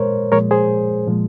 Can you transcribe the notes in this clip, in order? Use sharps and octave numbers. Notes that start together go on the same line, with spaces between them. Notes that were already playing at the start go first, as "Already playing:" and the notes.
Already playing: A#2 G#3 A#4 C5 C#5
A#2 F3 G#3 A#4 C#5
G#4 C5
A#2 F3 G#3